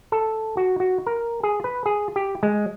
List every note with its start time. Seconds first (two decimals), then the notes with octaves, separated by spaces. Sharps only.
0.12 A4
0.57 F#4
0.80 F#4
1.06 A#4
1.43 G#4
1.64 B4
1.86 G#4
2.16 G4
2.43 G#3